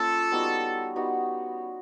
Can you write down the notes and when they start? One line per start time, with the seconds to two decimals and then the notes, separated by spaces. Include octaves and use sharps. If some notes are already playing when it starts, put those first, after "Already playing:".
Already playing: A#3 C#4 F4 A4
0.32 G3 B3 D#4 F#4
0.96 G3 B3 D#4 F#4